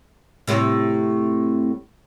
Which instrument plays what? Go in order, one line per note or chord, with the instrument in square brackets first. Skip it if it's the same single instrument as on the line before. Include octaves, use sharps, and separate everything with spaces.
[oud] A2 C3